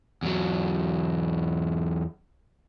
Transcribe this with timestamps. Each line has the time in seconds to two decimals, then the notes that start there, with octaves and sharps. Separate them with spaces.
0.23 E2 F#3